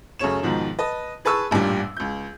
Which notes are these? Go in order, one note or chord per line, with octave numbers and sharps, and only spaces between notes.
F#2 C#3 A3 C#5 E7
G#2 B2 D#3 F3
B4 D#5 A5
G#4 B4 A5 C#6 E6
A1 G2 A#2 G3
C#2 G6